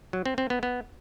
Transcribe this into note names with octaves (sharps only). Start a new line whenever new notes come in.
F#3
C4
C4
B3
B3